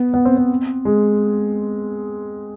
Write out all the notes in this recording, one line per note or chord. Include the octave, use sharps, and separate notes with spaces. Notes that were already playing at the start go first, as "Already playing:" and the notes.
Already playing: B3
B3
C4
C4
G#3